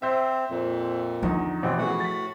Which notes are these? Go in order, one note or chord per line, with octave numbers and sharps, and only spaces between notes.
C4 C5 E5
F2 A#2
E2 D3 F3 D#4
A1 B2 E3 C4
A2 E3 B3 F#4 G#4 F#5
A6 B6